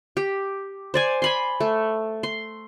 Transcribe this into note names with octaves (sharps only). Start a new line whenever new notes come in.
G4
C5 D5 G#5
G#5 B5 C6
A3
C6